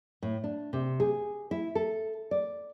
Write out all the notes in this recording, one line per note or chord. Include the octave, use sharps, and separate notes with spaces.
A2
D4
C3
G#4
E4
A4
D5